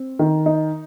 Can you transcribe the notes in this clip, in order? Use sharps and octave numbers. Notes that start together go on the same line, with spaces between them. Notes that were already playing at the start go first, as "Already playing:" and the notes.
Already playing: C4
D#3
D#4